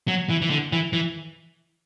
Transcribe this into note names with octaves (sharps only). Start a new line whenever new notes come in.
F#3
E3
E3
D3
E3
E3